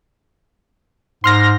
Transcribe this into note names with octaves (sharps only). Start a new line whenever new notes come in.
G#2 C6 F6 A#6